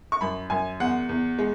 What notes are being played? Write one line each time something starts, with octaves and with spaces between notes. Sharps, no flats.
C#6
F#2 B5
F#2 G#5
E2 F#5
E2
G#3